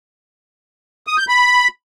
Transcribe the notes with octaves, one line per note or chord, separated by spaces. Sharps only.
D#6
G6
B5